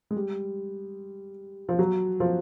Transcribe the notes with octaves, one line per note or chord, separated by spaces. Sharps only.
G#3
G3
F3
F#3
F3